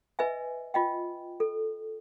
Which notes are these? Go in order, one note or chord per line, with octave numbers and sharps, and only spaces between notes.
B4 D#5 E5 G#5
F4 D#5 G5
A4